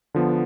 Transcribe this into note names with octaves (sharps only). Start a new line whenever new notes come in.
D3 F3 B3